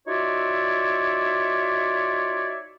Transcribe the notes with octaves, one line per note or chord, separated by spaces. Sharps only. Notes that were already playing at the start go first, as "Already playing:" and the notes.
D#4 F4 F#4 C#5 D5 E5